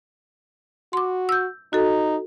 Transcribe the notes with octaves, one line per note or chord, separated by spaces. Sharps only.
F#4 C6 D6
E6 G6
D#4 F#4 A4